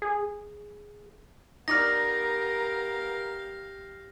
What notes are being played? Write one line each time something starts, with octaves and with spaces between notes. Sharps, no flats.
G#4
B3 D#4 G4 A#4 D5 F5 F6 A#6